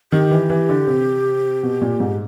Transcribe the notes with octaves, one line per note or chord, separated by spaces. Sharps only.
D#3 G4
E3
E3
D3
C3
B2
A#2
G#2